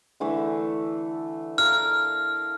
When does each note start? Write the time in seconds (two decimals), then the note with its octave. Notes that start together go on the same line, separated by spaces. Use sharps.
0.20 D3 E3 A3
1.58 A4 A#4 F5 F6